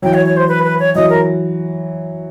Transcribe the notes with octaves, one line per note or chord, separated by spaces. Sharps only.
E3 F#3 G5
C#5
C#5
C5
B4
B4
C#5
E3 F#3 D#5
A#4